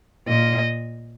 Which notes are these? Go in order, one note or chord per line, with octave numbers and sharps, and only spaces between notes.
A#2 D#5